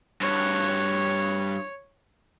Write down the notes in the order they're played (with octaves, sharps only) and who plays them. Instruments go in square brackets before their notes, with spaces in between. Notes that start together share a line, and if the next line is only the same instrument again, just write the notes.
[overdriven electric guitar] G2 F#4 [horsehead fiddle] C#5